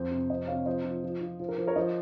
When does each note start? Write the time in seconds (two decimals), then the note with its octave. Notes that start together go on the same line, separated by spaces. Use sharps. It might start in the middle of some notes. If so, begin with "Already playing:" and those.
Already playing: F2 C5
0.11 C3
0.30 F2 C5 D#5
0.48 C3 C#5 F5
0.66 F3 C5 D#5
0.85 F3
1.04 F3
1.21 F3
1.40 F3 C5
1.49 A#4
1.58 F3 C5
1.67 A#4 C#5
1.76 F3 C5 D#5